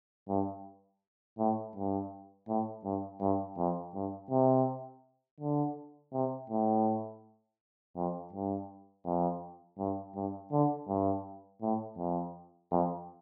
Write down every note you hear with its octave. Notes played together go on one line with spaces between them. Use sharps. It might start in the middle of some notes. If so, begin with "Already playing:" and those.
G2
A2
G2
A2
G2
G2
F2
G2
C3
D3
C3
A2
F2
G2
F2
G2
G2
D3
G2
A2
F2
F2